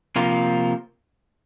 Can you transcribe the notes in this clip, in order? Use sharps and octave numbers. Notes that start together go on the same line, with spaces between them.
C3 F3 A#3 F4